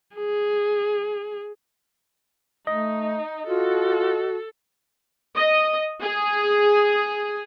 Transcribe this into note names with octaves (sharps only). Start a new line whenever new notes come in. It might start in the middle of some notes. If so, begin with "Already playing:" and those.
G#4
A3 D#4 D#5
F4 F#4 A4
D#5
G#4